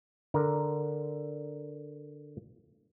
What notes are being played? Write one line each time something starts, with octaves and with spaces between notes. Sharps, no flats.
D3 A#4